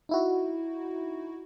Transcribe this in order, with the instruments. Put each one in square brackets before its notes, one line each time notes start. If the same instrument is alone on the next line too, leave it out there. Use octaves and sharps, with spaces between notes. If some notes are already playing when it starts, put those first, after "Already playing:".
[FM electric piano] D#4 E4 F#4